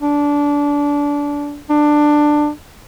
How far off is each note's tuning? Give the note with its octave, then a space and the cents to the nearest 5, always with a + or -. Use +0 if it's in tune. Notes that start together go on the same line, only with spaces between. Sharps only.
D4 -20
D4 +15